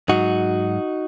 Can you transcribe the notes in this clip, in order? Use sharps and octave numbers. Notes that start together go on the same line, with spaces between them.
G#2 F#3 D#4 F#4